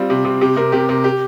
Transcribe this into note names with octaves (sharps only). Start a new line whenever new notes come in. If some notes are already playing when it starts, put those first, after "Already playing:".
Already playing: G3 C4 F4
C3
C3
C3 G4
C3 A#4
C3 G4
C3 A#4
G4